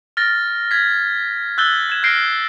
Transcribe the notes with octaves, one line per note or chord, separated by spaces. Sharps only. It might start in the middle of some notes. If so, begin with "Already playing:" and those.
F6 A6 A#6
G#6 B6
E6 F#6 G6 A6 G7
G#6 E7
F6 G6 A#6 C7 D7